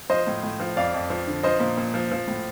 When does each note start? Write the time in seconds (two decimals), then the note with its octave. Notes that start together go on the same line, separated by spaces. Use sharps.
0.10 F3 C5 D#5
0.27 A2
0.43 A2
0.60 F3
0.77 F2 D5 F5
0.94 F2
1.10 F3
1.27 D3
1.43 F3 C5 D#5
1.60 A#2
1.77 A#2
1.94 F3
2.12 F3
2.28 A2